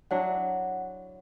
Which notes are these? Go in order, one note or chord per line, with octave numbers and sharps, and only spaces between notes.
F#3 D4 E4 F#5